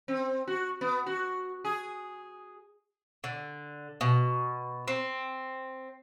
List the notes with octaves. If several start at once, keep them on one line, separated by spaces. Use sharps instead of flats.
C4
F#4
B3
F#4
G#4
D3
B2
C4